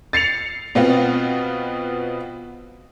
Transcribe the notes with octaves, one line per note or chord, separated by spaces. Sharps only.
A6 C7 C#7 F7
B2 B3 C4 F4